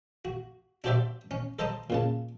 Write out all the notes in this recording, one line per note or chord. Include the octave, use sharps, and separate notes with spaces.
F#4
D4 F#4 G4 C5 D5 E5
C#4
A4 C5 D#5 A5 A#5 D#6
A#2 C#3 A5